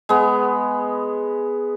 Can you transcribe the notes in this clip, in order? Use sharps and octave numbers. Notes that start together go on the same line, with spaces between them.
G#3 B3